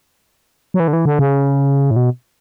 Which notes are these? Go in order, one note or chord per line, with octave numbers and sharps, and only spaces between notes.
F#3
E3
D3
E3
D3
C#3
A2
B2